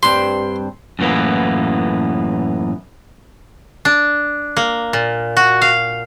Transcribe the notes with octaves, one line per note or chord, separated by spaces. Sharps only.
G2 C4 C6
F#2 A2 E3 A#3 B3
D4
A#3
A#2
F#4
F5